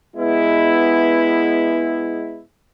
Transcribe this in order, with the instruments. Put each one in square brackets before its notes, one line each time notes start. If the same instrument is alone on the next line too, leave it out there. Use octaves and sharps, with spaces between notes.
[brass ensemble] G#3 B3 E4